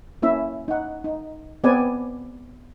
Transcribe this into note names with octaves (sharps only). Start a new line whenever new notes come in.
A#3 C#4 E4 E5
D#4 F#5
D#4
B3 C4 G#4 B4 D5 G#5